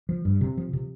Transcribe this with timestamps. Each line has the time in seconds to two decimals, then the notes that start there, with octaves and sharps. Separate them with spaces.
0.09 F3
0.25 G2
0.41 C3
0.57 F3
0.73 C3